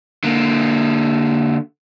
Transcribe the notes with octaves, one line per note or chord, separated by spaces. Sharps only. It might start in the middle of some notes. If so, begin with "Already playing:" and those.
D3 A#3